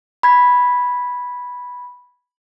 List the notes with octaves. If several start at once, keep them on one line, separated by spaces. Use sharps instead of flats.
B5 G#6 B6